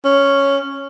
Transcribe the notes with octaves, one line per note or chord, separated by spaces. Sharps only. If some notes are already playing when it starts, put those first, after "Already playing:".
C#4